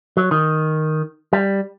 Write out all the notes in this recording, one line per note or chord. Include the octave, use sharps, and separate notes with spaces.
F#3
D#3
G3